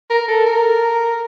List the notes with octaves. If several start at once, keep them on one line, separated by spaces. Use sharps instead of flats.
A#4
A4
A#4